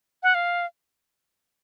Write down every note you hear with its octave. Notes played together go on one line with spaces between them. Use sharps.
F#5
F5